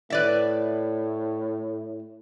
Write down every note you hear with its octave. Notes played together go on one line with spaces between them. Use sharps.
A2 B4 D5 E5